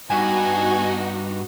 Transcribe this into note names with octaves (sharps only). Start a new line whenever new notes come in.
G2 B3 D#4 F#4 G#5